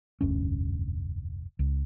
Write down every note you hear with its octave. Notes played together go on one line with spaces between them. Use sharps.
F1 D2 G2 C#4
C#2